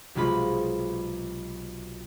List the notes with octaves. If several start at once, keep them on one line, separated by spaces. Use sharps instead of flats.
B1 C3 G#3 F4 B5